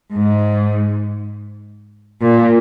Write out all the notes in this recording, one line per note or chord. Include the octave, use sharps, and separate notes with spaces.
G#2
A#2